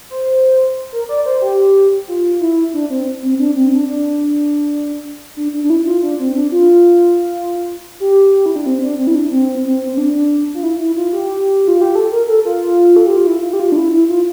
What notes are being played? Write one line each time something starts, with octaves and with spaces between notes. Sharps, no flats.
C5
A#4
D5
C5
G4
F4
E4
D4
C4
C4
D4
C4
D4
D4
D4
D4
D4
E4
F4
D4
C4
D4
F4
G4
E4
D4
C4
D4
C4
E4
D4
C4
C4
C4
D4
F4
E4
E4
F4
G4
F4
G4
A4
A#4
A4
F4
A4
G4
F4
E4
F4
G4
F4
D4
E4
E4
F4